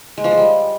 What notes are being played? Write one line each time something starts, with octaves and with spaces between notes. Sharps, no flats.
G#3
F3
G#4
G3